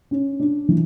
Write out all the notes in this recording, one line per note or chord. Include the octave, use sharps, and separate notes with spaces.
C#4
D4
E3